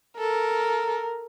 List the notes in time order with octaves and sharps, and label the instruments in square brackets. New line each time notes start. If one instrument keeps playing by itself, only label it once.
[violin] A4 [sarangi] A#4